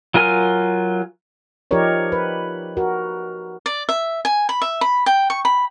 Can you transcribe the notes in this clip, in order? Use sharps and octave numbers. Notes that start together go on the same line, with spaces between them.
F#3 F4 A#4 G#5 F6
F3 D#4 G4 A#4 C#5 D5
B4
F#4 A#4
D5
E5
G#5
B5
E5
B5
G5
C#6
B5